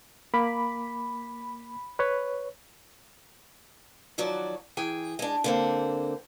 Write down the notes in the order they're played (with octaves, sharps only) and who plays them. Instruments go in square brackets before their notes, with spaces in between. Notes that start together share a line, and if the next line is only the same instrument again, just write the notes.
[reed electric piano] A#3 D6 [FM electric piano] B5
[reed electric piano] B4 C#5
[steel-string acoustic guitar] D#3 F3 F#3 F#4 D5
E3 G#4 G5
G#3 D4
D3 A#3 C4